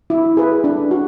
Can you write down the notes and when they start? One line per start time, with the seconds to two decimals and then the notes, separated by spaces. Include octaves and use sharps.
0.10 E4
0.37 G#4 B4
0.64 D4
0.91 F#4